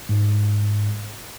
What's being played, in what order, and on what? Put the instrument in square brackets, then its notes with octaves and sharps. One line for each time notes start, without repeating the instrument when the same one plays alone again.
[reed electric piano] G#2